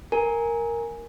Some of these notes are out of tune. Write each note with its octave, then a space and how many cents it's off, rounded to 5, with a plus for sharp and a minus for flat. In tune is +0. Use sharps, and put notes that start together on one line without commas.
A#4 +0 G#5 +0